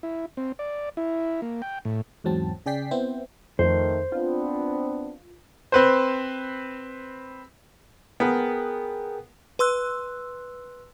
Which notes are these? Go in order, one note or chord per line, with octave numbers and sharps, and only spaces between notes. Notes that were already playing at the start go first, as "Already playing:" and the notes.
E4
C4
D5
E4
A#3
G5
A2
E2 G#2 F#3 C4 A5
C#3 G#4 D5 G5 B6 C7
B3 C4 E4 C5
F2 D#3 A3 C5
B3 C4 D4 F4
C4 B4 C5
B3 G#4 A#4 G5
B4 C6 E6 F#6